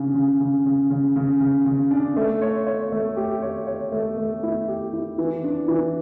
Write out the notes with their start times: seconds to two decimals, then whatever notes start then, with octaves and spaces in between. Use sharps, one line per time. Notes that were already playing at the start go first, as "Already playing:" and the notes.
Already playing: C#3 D4
0.14 C#3
0.40 C#3
0.65 C#3
0.90 C#3
1.16 C#3
1.40 C#3
1.66 C#3
1.91 D4
2.16 A3
2.41 C#5
2.67 C#5
2.92 A3
3.17 G4
3.42 C#5
3.67 C#5
3.92 A3
4.17 A3
4.43 E4
4.68 G4
4.93 E4
5.18 E3
5.44 D4
5.68 E3